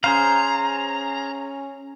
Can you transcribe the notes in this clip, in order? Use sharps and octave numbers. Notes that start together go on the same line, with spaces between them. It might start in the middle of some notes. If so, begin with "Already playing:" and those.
C#4 G#4 C5 F5 A#5